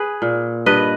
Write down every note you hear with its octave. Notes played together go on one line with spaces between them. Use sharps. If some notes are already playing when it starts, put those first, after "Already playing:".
Already playing: G#4 B4
A#2
G2 B4 D#5